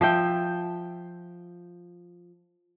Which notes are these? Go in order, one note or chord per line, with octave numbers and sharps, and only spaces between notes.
F3 E5 G5